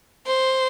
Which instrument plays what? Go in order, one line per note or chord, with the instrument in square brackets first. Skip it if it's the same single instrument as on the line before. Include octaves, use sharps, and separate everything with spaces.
[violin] C5